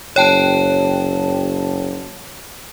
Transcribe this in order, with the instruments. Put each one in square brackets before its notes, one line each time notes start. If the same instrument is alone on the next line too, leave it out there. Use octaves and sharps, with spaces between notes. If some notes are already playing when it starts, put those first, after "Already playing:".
[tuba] F#1 [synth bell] C#5 G5 A5